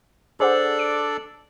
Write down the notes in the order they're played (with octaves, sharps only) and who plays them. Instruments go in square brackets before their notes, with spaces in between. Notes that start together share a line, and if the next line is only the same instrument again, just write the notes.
[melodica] D4 A4 D5 [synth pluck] G#4 C5 F#5
[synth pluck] D7